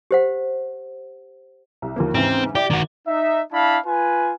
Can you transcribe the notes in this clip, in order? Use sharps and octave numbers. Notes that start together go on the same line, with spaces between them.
G4 C5 F#5
C2
D#2 F3 A#3
G#2 C#3 E3 C4
E4 G4 D5
D#3 F#4
D#4 E5
D4 E4 F5 A5 B5
F4 B4 G#5